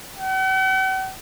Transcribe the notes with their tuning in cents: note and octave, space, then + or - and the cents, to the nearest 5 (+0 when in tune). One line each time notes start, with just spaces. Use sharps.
F#5 +45